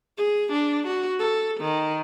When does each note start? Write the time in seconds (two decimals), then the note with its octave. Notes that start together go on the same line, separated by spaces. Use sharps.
0.18 G#4
0.52 D4
0.87 F#4
1.19 A4
1.60 D#3